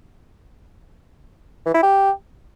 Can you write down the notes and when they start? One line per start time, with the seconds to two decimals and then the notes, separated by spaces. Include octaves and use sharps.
1.66 E3
1.74 E4
1.82 G4